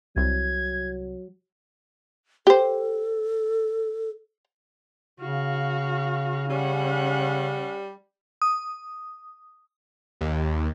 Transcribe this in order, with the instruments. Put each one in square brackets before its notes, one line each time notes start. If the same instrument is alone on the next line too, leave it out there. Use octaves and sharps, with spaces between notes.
[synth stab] C2 [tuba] F#3 [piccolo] G#6
[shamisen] G4 C5 [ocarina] A4
[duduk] C#3 [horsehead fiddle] F#4 F5
[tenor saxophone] G3 [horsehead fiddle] C#4 F#5
[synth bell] D#6
[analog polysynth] D#2